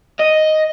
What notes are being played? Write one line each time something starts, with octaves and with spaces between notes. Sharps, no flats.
D#5